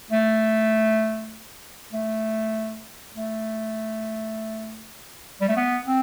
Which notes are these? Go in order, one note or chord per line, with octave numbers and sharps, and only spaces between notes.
A3
A3
A3
G3
A3
B3
C4